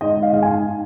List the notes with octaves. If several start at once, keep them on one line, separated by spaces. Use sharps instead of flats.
G#2 D#5
G#2
F5
G#2 F5
G#5
G#2